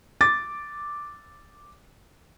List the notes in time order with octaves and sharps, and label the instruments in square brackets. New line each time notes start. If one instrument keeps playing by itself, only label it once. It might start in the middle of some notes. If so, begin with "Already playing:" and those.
[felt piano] D6 A6